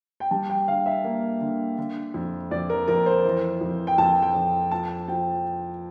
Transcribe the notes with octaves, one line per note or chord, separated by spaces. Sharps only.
G5
G3 A5
G5
D3 F5
E5
A#3
D3
D3
F2
F2 D5
A#4
F2 A#4
C5
E3
F2
G5
F2 A5
G5
F2
F4 A5
F3 G5